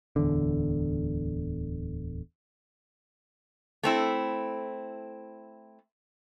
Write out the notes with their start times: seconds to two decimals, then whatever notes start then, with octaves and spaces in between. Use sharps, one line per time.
0.16 D1 E2 D3
3.83 A3 C4 E4